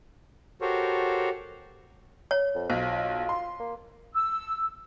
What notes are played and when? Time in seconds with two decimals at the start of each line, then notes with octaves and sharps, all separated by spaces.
0.61 F#4 G4 A4 A#4 C5 C#5
2.31 C#5
2.55 F2
2.70 B1 F4 C5
3.29 C6
3.60 A#3
4.14 E6